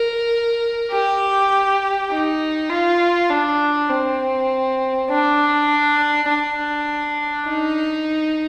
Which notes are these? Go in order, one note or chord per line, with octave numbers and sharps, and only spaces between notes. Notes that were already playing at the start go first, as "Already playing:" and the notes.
Already playing: A#4
G4
D#4
F4
D4
C4
D4
D4
D#4